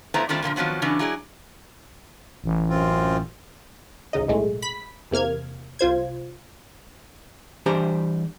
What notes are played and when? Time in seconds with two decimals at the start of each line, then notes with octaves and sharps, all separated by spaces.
0.14 F2 A3 B3 E4 C5 A#5
0.29 D#3 G3 A3 C4 D4 F4
0.42 A#2 D3 E3 F3
0.56 D#3 F3 F#3 B3 C4
0.82 C#3 E3 F#3 C#4 D4
0.99 F#3 E4 G#4 D5
2.44 A1
2.70 F#2 C4 F4
4.13 A1 D2 C#3 D#4 D#5
4.28 B1 A2 G#3 A3
4.62 B5 B6
5.11 E2 C3 A#3 F6 G#6
5.79 C2 F4 C5 G#6
7.66 E3 G3 D4 G4 C5 A#5